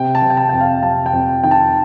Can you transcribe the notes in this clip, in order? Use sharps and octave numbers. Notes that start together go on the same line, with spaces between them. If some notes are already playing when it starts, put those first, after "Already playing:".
Already playing: C3 G5
A5
C3
G5
A5
F2 G5
F5
C3 A5
G5
F2
D#3 G5
A5